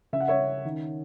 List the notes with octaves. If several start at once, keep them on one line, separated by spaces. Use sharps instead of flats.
C#3 E5
F#5
C#5 E5
C#4
D#3